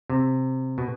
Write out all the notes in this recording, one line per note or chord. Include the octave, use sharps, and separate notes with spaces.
C3
B2